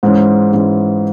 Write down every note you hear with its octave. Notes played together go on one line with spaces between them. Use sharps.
G#2 E3 G#3 C#4
G#2 E3 G#3 C#4